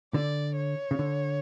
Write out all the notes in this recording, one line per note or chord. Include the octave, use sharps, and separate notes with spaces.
D3 D5
C#5
C#3
D3